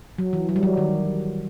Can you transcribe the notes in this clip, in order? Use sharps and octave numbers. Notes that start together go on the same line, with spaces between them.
F#3
E3
F#3
G3
F#3
D#3